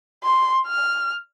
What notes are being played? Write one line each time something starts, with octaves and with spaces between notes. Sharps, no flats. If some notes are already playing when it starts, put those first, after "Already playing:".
C6
F6